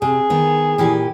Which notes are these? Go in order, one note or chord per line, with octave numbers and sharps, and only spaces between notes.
C3 G#4
D#3 B3
A#2 E3 G4